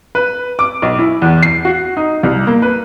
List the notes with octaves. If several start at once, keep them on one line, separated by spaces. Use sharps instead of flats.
B4
D6
B1
E4
E2
C7
F#4
D#4
C2
A#3
B4